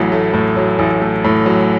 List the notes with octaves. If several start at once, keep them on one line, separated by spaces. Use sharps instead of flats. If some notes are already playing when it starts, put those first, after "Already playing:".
Already playing: A1 A2 F#3
A3
A2
F#3
A1
A3
A2
F#3